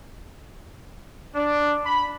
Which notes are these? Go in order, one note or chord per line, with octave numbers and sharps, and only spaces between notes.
D4
B5